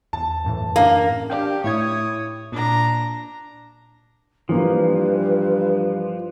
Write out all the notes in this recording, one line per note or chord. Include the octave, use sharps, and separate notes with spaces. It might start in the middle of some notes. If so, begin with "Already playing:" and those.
E2 A5
F#2 A2 E3
A#3 C#4 D4 F5
D4 G4 F5 G5
A2 E4 C#5 D#6 G#6
A#2 D4 A#5
G2 E3 F3 A#3 B4